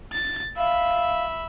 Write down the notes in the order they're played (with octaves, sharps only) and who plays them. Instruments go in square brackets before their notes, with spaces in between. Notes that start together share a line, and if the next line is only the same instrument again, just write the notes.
[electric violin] A6
[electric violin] E5 B5 [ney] F5